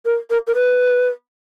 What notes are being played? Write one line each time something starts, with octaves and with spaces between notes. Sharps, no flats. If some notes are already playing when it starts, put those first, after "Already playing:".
A#4
A#4
A#4
B4